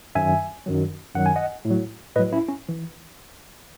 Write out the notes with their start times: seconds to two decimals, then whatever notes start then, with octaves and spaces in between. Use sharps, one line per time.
0.15 F#2 D#3 F#3 E5 G#5
0.66 F#2 D#3 F#3
1.15 F#2 D#3 F#3 F#5
1.26 G#5
1.36 D#5 F#5
1.65 A2
1.70 F#3
2.16 A2 B4 D#5
2.19 F#3
2.33 C#4 E4
2.49 C#4
2.69 E3